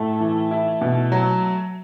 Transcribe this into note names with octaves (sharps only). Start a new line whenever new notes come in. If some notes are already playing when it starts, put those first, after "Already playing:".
Already playing: A2 A3
E3
E4
B2
F#3